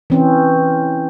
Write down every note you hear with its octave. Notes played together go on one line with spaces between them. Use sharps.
E3 C4 C#4